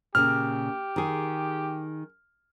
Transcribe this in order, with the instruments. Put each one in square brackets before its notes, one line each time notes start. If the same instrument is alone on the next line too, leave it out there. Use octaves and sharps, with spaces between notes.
[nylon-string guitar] A#2 C#3 [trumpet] G4 [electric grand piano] F6
[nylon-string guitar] D#3 G#4